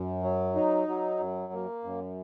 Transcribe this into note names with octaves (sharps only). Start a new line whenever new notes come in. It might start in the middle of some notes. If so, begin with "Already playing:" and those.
Already playing: F#2
F#3
D#4
F#3
F#2
A#3
F#2